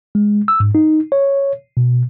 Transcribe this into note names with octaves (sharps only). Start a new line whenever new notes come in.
G#3
E6
G#2
D#4
C#5
B2